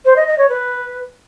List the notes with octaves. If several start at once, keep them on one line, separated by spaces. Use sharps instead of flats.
C5
D#5
D#5
C#5
B4